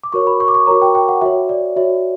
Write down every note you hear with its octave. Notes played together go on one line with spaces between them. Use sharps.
D6
F#4 A#4 C#5 C#6
B5
C#6
D6
C#6
F#4 A#4 C#5 A#5
G5
G5
F#5
F#4 C#5 E5
D5
F#4 C#5 E5